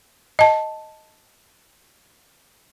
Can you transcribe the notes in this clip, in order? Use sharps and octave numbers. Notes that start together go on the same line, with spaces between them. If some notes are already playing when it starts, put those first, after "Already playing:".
D#5 A5